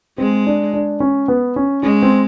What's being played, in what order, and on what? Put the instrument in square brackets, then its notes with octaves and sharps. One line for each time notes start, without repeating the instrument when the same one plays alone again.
[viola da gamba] G#3 [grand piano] C4
[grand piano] D4
D4
C#4
B3
C#4
[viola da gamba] G#3 [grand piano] C#4
[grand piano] C4